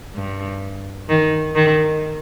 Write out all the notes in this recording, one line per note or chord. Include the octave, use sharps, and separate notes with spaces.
G2
D#3
D#3